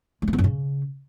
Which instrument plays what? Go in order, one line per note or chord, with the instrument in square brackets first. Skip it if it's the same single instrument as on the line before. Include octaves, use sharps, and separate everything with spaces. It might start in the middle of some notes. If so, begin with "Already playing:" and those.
[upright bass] G#3
A#3
B3
F#2
C#3